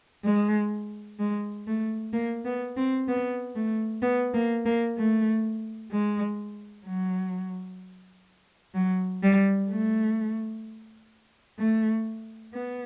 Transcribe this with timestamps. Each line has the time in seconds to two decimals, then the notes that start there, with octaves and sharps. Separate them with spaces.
0.24 G#3
1.19 G#3
1.67 A3
2.13 A#3
2.45 B3
2.77 C4
3.08 B3
3.55 A3
4.02 B3
4.34 A#3
4.66 A#3
4.98 A3
5.92 G#3
6.86 F#3
8.75 F#3
9.23 G3
9.70 A3
11.58 A3
12.54 B3